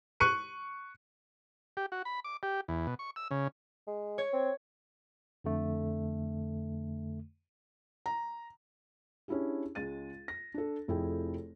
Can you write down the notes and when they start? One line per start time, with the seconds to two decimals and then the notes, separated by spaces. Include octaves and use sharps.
0.20 C#6 F#6 C#7 D#7
1.77 G4
1.92 F#4
2.05 B5
2.24 D6
2.43 G4
2.68 E2
2.87 B2
2.99 C#6
3.16 E6
3.31 C#3
3.87 G#3
4.18 C#5 G#6
4.33 C4
5.44 F2 D3 A3
8.06 A#5
9.28 C#4 D4 E4 G4 G#4
9.75 C#2 G#3 A6 D#7
10.28 A#6
10.54 D4 A4
10.88 F1 F2 E4 G#4 A4 G5